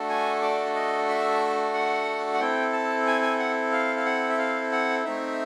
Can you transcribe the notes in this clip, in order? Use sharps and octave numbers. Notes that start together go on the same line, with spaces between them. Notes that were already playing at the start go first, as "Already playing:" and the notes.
Already playing: A3 D4 F#4 A4
G#5
D5
D#5
E5
F#5
F#5
C4 E4 A4 G5
A5
G#5
G#5
F#5
F5
F5
F#5
E5
F5
F#5
A3 C4 D#4 E5